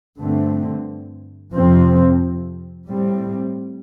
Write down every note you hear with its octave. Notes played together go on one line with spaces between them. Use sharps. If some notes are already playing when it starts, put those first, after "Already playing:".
G2 D3 A3 C4
F2 C3 F3 C4
A2 G3 C4